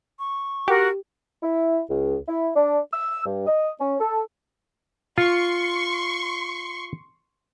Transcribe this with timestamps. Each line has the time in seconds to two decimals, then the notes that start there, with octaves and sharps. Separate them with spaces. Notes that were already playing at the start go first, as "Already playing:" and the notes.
0.19 C#6
0.68 F#4 G4 A#4 F#5
1.42 E4
1.90 C#2
2.28 E4
2.56 D4
2.92 E6
3.26 G2
3.47 D#5
3.79 C#4
4.00 A4
5.18 F4 C6 C#6